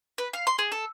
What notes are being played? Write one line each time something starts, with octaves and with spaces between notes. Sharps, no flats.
B4
F5
C6
G#4
A4